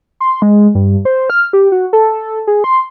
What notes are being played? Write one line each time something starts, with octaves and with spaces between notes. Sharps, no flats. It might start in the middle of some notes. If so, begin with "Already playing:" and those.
C6
G#3
G2
C5
F6
G4
F#4
A4
G#4
C6